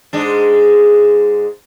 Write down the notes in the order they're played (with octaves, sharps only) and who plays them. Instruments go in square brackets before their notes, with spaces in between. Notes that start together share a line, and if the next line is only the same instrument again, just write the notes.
[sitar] G#2 G#3 D4